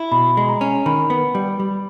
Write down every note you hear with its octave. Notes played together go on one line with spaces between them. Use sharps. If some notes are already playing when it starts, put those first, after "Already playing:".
Already playing: E4
B2 B5
G#3
A#5
C#4
D#3 B5
B3
G3
G3